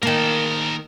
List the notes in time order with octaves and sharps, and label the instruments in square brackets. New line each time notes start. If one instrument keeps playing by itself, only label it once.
[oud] D#3 A#3 [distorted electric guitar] A#4 A5